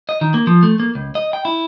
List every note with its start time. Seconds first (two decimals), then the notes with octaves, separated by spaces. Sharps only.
0.09 D#5
0.21 D#3
0.34 A#3
0.47 F3
0.63 A3
0.80 A#3
0.95 C#2
1.15 D#5
1.33 G5
1.45 E4